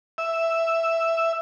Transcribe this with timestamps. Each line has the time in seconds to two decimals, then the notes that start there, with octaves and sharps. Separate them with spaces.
0.18 E5